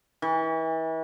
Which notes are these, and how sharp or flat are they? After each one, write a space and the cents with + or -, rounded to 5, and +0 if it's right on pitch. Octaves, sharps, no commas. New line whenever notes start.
E3 -35